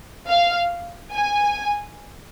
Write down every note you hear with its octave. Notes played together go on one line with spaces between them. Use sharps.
F5
G#5